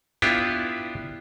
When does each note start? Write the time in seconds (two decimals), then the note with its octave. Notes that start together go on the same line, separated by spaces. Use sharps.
0.22 B3 D4 E4 F4 G4